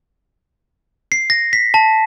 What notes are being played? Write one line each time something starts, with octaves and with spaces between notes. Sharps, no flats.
C7
A#6
B6
A5